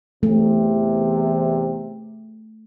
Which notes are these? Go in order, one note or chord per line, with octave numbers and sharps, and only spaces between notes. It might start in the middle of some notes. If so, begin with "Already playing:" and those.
E2 C3 A3